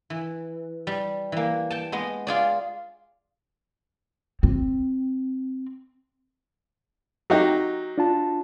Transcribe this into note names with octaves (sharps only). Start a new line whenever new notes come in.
E3
G3
E3 A#3
G5 A5
G#3 B3 D#5
F4 G#4 D5
C4
F#3 D#4 G4
D4 F4 A5